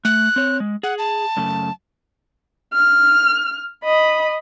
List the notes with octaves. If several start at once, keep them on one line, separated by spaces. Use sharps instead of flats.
A3 F#6
C4 C#5
G#3
G#4 F#5
A5
F#2 C#3 A3
F6
D#5 B5